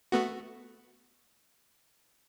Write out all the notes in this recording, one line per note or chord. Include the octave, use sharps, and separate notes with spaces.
A3 B3 F#4